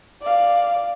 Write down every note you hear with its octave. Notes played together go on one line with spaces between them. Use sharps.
D5 F5